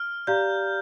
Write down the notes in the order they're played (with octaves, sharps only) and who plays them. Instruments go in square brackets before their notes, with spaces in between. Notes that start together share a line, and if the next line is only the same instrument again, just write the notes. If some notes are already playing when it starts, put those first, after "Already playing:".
Already playing: [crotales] F6
[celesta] G4 D5 F5 A#5 [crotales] G6